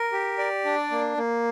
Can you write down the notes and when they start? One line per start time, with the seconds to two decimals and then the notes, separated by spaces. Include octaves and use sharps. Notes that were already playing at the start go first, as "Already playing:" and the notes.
Already playing: A#4
0.12 G4
0.38 D5
0.65 D4
0.91 A#3
1.17 A#3